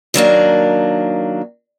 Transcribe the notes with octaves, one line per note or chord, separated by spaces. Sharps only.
D#3 F#3 A#3 D4